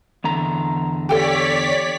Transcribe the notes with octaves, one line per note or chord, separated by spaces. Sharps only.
E2 D3 A#5
G4 A4 C#5 D5 G5 B6